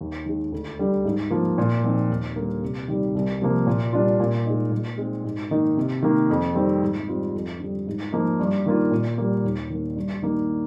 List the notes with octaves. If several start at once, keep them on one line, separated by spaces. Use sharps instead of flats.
D#2
D#3 G#3
D2
D3 G3
G#2
F3 A#3 F4
A#2
F3 C4 D#4
D#2
D3 G3 A#3
C3
D#3 G3
C2
C3 F3 A#3
A#2
G3 D4 F4
A#2
G#3 D#4
A#2
G#3 C4 D#4
G#2
D#3 A#3 D#4
C3
D#3 A#3
F2
D#3 G3 C4
G#2
G3 C4 F4
F2
D3 G3
G#2
F3 A#3 D#4
G2
D#3 A#3 F4
A#2
G3 A#3
D#2
D#3 A#3
G2
D#3 A#3 D#4